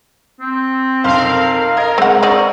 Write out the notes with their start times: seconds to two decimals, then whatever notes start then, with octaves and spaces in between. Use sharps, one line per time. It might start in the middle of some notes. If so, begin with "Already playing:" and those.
0.41 C4
1.04 B1 F2 A#4 F5 C6
1.77 A#4 D#5 A#5 G#6
1.98 G#3 C4 F#5
2.23 C4 G#4 D5 D#5 C#6